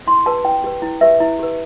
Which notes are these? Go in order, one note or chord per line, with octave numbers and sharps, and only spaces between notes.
E4 C6
G4 B4 A5
E4 G5
G4 B4
E4
G4 B4 E5
E4
G4 B4